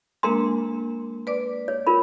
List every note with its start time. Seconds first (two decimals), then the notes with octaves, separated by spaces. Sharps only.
0.23 G#3 A#3 D4 A#4 A#5 C6
1.27 B4 D5 D6
1.68 C#5
1.87 F4 A#4 B5